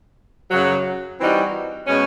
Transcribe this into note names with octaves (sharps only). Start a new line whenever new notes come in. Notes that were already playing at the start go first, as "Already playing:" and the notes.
F#2 C#3 F#3
E3 G3 C4 D#4 F#4
B2 G#3 C#4